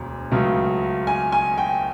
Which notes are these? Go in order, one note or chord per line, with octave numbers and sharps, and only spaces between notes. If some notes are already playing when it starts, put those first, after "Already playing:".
Already playing: E1 D2
C#2 C#3 F#3 A3
G#5
G#5
G5